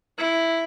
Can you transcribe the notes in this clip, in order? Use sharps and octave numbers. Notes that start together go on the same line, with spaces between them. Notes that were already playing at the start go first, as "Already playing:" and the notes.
E4